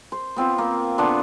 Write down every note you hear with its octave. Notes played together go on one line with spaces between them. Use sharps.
C5
B3 C4 F4
A#3
D3 B3 D4 F4